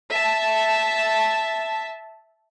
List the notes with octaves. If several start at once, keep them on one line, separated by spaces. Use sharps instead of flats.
E5 A5